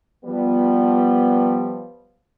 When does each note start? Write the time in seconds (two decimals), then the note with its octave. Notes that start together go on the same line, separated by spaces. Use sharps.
0.25 F3 G3 B3